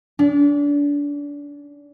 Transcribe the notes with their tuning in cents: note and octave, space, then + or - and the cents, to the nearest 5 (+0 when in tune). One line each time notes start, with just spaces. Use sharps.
D4 -30